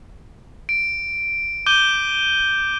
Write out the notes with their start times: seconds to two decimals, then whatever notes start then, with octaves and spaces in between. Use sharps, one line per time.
0.69 D7
1.66 D6 G6 D#7 G7